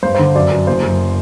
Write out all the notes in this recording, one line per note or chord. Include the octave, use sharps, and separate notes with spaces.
G2 C5
C5
D3
F#2 D5
F#2
F#1 C5
F#2